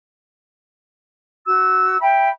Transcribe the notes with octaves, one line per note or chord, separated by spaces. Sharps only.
F#4 E6
E5 G5 B5